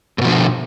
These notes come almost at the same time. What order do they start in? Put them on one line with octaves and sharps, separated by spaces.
G#2 B2 F3 D3